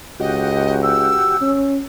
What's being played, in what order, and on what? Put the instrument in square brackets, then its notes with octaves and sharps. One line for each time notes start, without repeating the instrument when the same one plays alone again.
[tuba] C#2 [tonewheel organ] F#4 G4 [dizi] D#5
[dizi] E6
[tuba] C#4